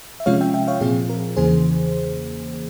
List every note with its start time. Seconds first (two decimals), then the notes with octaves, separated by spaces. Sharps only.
0.20 E5
0.26 C3 F3 G#3 C#4 F4 C#5 F5
0.41 E5 G5
0.54 E5 G5
0.67 C#5 F5
0.81 A#2 F3 C4 F4 G#4
1.09 A#4
1.37 E2 C#3 E3 A#3 G#4 C5